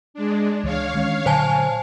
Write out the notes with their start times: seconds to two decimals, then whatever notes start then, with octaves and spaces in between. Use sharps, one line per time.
0.14 G#3 D4
0.63 C#2 E3 C#5 F5
0.94 D#3 G#3 C#4
1.26 A#2 D3 F#3 C5 G#5 A5